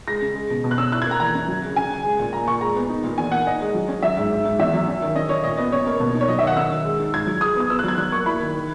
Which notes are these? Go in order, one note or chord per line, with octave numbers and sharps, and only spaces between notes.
G#3 A#6
C#3
G#3
B2
B2
F#6
C#4 E6
E4 F#6
G#6
A#3 A#5
E3 A#5
F#2
F#3
C#3
C#3 G#5
C#3
G#3
A#2
A#2 A#5
A#2 C#6
G#3 A#5
B3
D#4
A#2
E2 G#5
A#3 F#5
D#4 D#5
G#3
F#3
C#4
F#3 E5
G#2
G#2
G#2
E2 E5
F#3
C#4
D#3
C#4 D#5
C#4 C#5
A#2 D#5
B3 D#5
F#2 C#5
A#3
B2
D#4
C#5
F#3 D#5
E5
D#3 F#5
C#4 E6
D#3
G#3
D#4
G#2 G#6
F#3
G#3 D#6
B3 D#6
B3 E6
F#6
F#3 G#6
F#3 F#6
A#3 C#6
E4 B5
D#3
D#3